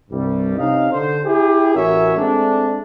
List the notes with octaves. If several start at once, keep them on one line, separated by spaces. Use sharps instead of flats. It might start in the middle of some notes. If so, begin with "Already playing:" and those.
C2 G2 G3
C3 C#4 D#4 D#5 F5
D3 C5
E4 G4 G#4
A1 C#4 F#4 A#4 C#5 E5
G#3 A3 C4 D4